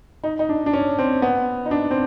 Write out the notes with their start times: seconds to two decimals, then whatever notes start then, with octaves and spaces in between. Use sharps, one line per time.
0.24 D#4
0.39 D#4
0.49 D4
0.66 D4
0.73 C#4
0.99 C4
1.22 B3
1.66 D#4
1.71 D4
1.91 C4